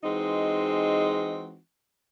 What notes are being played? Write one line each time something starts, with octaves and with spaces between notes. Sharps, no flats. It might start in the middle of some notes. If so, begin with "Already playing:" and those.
E3 G#3 C4 D#4 F#4